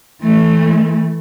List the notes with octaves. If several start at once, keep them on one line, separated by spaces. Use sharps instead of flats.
E3 A3